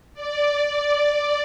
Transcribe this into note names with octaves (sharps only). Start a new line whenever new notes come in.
D5
D5
D5